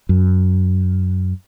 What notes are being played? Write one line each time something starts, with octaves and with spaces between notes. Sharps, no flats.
F#2